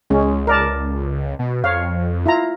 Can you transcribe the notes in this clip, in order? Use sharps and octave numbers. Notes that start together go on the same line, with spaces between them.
C#2 G#3 C#4
A#4 D5 A5
B2
F2 C#5 F5
E4 F4 A#5